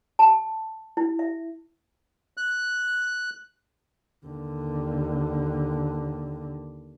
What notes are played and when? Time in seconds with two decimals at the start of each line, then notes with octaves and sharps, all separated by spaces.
0.19 A5
0.97 E4
1.19 E5
2.37 F#6
4.26 D#2 D3